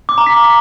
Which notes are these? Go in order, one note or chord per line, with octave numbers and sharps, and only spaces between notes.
D6
A#5
B6